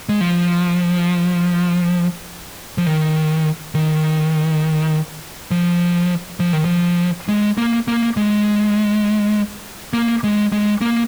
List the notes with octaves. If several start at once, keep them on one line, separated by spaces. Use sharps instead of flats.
G#3
F3
F3
D#3
D#3
F3
F3
D#3
F3
G#3
A#3
A#3
G#3
A#3
G#3
G#3
A#3